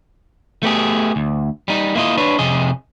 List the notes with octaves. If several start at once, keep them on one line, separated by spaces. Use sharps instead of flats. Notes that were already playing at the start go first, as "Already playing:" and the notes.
A3 B3 G4 G#4
D2
G3 D#4
A#3 E4 F4 D#5
D4 B4 C#5
F2 C3 G#4 D#5